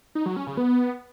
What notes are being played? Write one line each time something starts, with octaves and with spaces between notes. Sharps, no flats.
D#4
F#3
C#4
C#3
B3